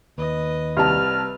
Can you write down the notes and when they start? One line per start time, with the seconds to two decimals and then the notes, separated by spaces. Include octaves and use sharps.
0.18 D#2 B4 D#5
0.77 C2 G3 B4 A5 F6